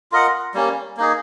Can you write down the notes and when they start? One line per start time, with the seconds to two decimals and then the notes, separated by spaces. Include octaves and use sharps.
0.12 F4 A#4 D#5 F#5
0.54 G3 A#3 C#4
0.97 A#3 D#4 G#4